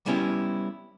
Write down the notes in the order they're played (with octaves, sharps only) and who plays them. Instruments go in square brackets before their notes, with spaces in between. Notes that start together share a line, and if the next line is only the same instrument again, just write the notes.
[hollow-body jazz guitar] G3 B3 C#4 E4 G4